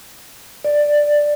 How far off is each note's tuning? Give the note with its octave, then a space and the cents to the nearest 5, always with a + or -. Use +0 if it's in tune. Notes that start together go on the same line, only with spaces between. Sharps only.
D5 +5